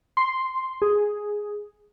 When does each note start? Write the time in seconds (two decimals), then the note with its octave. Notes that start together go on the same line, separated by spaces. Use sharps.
0.17 C6
0.82 G#4